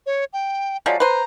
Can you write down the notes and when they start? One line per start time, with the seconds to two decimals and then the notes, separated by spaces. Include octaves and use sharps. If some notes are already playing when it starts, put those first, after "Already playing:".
0.06 C#5
0.33 G5
0.86 F3 F#3 G#3 D5
1.00 B4 C5 A#5